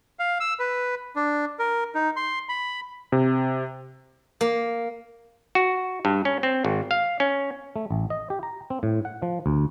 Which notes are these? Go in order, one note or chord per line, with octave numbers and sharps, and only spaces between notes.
F5
E6
B4
D4
A#4
D#4
C6
B5
C3
A#3
F#4
G2
C#4
C4
G#1
F5
C#4
A3
A1
D#5
G4
A#5
C4
A2
F#5
F3
D2